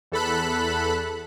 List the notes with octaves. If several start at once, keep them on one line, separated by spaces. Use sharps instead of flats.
E2 A4 B5 F#6